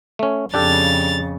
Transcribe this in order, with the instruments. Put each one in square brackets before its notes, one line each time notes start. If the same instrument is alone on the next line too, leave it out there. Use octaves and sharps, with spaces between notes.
[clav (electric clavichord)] A3 C#4
[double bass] F2 C#3 [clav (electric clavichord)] D4 G4 A4 [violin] A6 F7